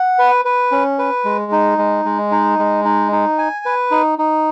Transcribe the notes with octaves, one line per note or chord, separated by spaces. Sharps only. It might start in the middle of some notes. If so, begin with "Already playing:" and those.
Already playing: F#5
B4
B4
C#4
B4
G#3
D#4
G#3
G#3
D#4
G#3
D#4
D#4
G#5
B4
D#4
D#4